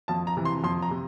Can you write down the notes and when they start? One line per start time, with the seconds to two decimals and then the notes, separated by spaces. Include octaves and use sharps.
0.08 F2 A5
0.27 A#5
0.37 C3 E3
0.45 C6
0.64 F2 C6
0.82 A#5
0.91 C3